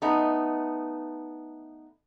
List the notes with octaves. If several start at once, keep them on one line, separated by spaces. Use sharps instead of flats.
A3 B3 D#4